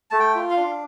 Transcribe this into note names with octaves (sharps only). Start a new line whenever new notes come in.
A3 A5
G5
F4
F5
D4